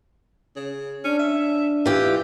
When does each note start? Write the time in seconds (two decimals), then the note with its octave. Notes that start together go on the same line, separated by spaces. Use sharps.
0.56 C#3
1.04 C#4 D4
1.19 E5
1.86 E3 F4 G4